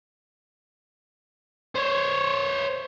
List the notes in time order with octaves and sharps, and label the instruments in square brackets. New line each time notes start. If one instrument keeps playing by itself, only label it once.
[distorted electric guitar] C5 C#5